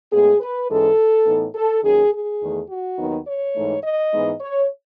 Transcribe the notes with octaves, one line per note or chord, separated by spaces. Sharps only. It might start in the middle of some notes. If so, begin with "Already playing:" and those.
A2 G#3 B3 G#4
B4
G#2 E3 G#3 C#4 A4
A2 E3 B3 D#4
A4
D#2 D#3 F#3 C#4 G#4
G#4
E2 D#3 A3
F#4
D#2 D#3 F#3 B3 D#4
C#5
G#2 E3 A3 D#4
D#5
G#2 E3 G#3 B3 D#4
C#5